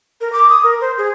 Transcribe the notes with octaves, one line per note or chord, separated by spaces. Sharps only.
A#4
D6
D#6
A#4
C5
G#4